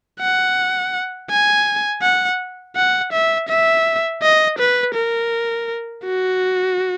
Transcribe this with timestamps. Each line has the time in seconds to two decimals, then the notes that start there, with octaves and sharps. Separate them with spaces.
0.20 F#5
1.30 G#5
2.02 F#5
2.76 F#5
3.12 E5
3.48 E5
4.22 D#5
4.58 B4
4.95 A#4
6.04 F#4